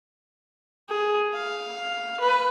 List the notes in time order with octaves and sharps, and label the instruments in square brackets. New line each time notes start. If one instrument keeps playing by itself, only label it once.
[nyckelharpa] G#4
F5
B4